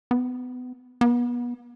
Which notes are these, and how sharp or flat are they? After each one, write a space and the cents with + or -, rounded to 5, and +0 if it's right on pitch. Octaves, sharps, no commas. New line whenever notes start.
B3 +25
B3 -30